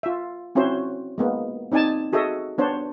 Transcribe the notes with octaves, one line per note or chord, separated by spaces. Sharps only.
F4 E5
C4 C#4 E4 F#4 C5
G#3 A#3 B3
C4 D#4 D5 G#5 A5
F#4 G#4 A4 D#5 E5
B3 D4 C5 C#5